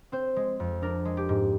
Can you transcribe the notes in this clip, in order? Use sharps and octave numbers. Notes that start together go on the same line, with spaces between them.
C4 C5
G#3
F2
D4 A#4
G#3
G4
G#2